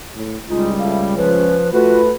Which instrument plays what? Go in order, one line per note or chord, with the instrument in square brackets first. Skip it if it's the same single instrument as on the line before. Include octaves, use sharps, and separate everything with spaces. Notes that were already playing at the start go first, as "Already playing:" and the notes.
[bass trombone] A2
[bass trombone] C#2 [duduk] G3 [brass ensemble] G#3 D#4 [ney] F4
[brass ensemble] A3 E4 [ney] F5
[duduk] F3 [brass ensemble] C#4 [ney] B4
[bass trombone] A3 [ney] F4 [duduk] F#4 [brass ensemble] B4